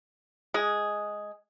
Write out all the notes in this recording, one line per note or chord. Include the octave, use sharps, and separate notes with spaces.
G#3 G#4